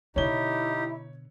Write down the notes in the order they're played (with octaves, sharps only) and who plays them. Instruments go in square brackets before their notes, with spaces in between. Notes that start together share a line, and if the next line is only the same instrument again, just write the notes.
[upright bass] B2 D3 [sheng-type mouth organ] D#4 G4 [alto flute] E4 [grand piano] C#5 G7